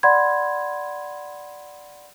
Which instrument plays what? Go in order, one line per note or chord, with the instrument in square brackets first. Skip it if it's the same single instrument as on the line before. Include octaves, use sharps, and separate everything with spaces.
[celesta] D5 F#5 B5 C6 G#6